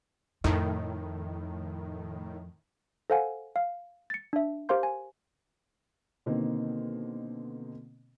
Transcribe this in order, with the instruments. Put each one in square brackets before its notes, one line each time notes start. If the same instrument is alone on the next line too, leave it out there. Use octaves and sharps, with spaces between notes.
[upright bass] F2 [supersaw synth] A2 D#3
[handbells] A4 C5 F5 F#5 G#5
F5
A6 C#7
D4 E5
G4 A#4 C5 F5 C6 G6
G#5
[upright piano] B2 D3 D#3 A#3 C4